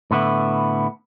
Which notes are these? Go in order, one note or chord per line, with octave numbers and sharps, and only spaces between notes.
A2 D3 B3 E4